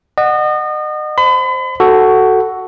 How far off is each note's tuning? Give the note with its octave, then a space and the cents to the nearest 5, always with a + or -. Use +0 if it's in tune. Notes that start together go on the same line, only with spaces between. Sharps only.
D#5 -35 F#5 +0
C5 +0 B5 +40
F#4 +10 A4 +0